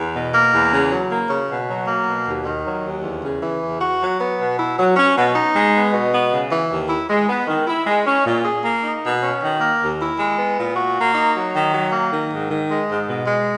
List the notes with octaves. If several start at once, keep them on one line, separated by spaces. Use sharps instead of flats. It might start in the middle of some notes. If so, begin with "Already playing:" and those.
Already playing: E2
B2
A#3
E2
C#3
F#3
A#3
C#3
B2
F#3
A#3
B2
D#2
D#3
F#3
D#2
E2
C#3
E3
E2
F#4
F#3
B3
B2
E4
F#3
C#4
B2
D#4
G#3
B3
B2
B3
C#3
E3
D#2
E4
G#3
B3
D#3
E4
G#3
C#4
A#2
G#4
A#3
D#4
B2
C#4
D#3
A#3
D#2
E4
G#3
B3
A#2
F#4
A#3
D#4
F#3
D#3
F#3
A#3
D#3
G#2
D#3
G#3
G#2
B2
G#3